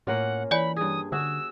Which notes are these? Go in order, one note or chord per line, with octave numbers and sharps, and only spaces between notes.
A2 A#3 C#4 F4 F#5
E3 C#5 D5 G#5 B5
G2 G#4 D#6
D3 F#4 G#4 E6